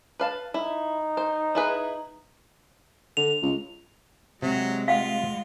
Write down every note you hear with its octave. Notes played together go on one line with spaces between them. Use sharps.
B4 F5 A5
D#4 E4
C5
E4 G#4 B4
D3 F7
C#2
C3 F#3 G#3
F4 F5 F#5